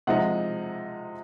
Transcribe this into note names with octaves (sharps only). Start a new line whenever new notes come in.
C3 F3 G#3 D#4 F#5